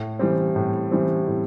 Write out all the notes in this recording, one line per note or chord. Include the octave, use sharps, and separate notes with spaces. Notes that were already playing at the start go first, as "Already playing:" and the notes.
Already playing: A2
E3 G3 C4
A2
E3 G3 C4
A2